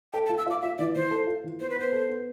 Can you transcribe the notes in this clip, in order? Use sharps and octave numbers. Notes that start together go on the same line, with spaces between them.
A4 G5
A5
F4
E6
F4 D6
F4 E5
E3 D5
E3 C5
A4
F4
E3
B3 C5
B4
B3 C5
A4
B3